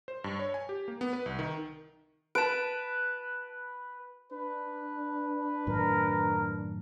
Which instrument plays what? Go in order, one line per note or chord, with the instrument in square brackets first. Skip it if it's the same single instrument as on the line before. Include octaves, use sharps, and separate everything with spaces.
[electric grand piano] C5
G2
C#5
G#5
G4
A#3
B3
B4
C2
D#3
[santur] B4 [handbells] A5 D7
[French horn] D4 [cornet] B4
[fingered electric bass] F#2 A2 D#3 [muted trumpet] A#4